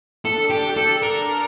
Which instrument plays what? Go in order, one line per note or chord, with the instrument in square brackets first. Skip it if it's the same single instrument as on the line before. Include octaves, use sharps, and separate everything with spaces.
[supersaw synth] D4 [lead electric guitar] A4
[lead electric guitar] G4
A4
A#4